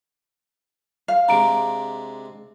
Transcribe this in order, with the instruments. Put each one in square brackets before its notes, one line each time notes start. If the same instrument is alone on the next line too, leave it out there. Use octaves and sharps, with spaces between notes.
[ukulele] F5
[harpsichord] C3 G#3 D4 [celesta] A#5 D7